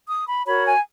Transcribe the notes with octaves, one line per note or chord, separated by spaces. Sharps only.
D#6
B5
F#4 A#4 C#5 B5
G#5